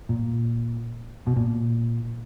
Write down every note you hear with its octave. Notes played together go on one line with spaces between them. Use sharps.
A#2
B2
A#2